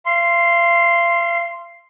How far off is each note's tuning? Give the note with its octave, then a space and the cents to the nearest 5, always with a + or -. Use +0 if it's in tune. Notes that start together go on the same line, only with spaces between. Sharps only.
F5 -40 C6 +0